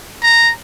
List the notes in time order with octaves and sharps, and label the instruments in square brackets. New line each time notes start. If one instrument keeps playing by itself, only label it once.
[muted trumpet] A#5